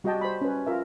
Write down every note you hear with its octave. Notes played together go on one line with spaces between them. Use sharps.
G3 F#4 G4 D#5 G5 A5
C5 B5
C#4 B4
F4 A#4 E5